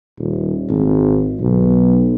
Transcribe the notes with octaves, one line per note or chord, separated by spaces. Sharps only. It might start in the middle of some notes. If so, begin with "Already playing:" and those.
D#1
G#1
B1